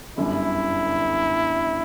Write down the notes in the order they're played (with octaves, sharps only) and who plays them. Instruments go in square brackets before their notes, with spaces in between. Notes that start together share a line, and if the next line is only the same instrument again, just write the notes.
[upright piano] G1 F#2 D3 G3 [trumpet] E4